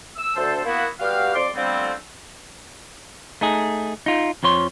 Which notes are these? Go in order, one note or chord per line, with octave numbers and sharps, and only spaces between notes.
E6
D2 A4 C5
A#3 B3 E4 F#4
G3 B3 F#4 G4 F5
F2 D5 C6 D6
D3 F3 G3 A3 B3 C4
A3 D#4 G#4
D#4 F4
F2 F3 C#5 C6